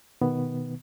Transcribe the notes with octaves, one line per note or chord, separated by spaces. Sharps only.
B2 D#3 B3